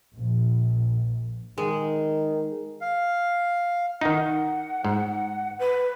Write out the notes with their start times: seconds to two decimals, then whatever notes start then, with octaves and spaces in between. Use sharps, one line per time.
0.14 A#1
1.58 D#3 G#3
2.81 F5
4.01 D#3 D#4 F#5
4.85 G#2
5.59 B4